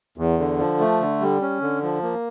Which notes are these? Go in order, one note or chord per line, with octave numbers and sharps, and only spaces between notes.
E2
D3
F3
A3
D3
G3
C#4
D3
F3
A#3